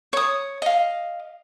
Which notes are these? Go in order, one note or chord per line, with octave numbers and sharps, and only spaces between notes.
C#5 D#6
D#5 F5